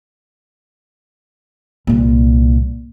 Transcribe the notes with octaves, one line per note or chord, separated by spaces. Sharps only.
C2 A#2